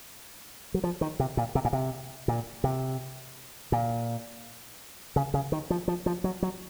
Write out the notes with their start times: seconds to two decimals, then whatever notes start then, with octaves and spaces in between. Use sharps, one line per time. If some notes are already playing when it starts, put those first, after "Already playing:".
0.74 F#3
0.84 F3
1.01 D#3
1.20 C3
1.37 A#2
1.55 C3
1.65 A#2
1.73 C3
2.28 A#2
2.64 C3
3.72 A#2
5.16 C#3
5.34 C#3
5.52 D#3
5.70 F3
5.88 F3
6.06 F3
6.24 F#3
6.43 F#3